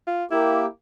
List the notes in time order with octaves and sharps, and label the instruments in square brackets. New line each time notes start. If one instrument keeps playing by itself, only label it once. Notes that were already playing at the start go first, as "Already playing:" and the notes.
[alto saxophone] F4
[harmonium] A#3 G4 [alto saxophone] E4